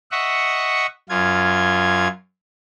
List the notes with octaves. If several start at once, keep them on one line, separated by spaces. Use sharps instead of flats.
D#5 E5 F#5 C#6
F#2 F4 G#6